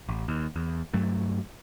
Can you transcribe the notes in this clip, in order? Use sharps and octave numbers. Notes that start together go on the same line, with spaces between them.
A1
D#2
E2
G2 F#3 A3